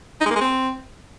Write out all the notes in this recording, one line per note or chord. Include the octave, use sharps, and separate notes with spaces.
D#4
G#3
A#3
G#3
C4